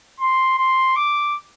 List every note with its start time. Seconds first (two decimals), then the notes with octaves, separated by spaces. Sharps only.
0.20 C6
0.58 C6
0.96 D6